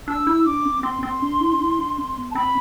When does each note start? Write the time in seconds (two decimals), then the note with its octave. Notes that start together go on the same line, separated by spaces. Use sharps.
0.08 D4 E6
0.27 E4
0.46 D4 D6
0.65 C4
0.83 C4 C6
1.03 C4
1.22 D4
1.40 E4
1.52 D4
1.60 E4
1.79 D4
1.98 C4
2.17 B3
2.31 A5
2.35 C4 B5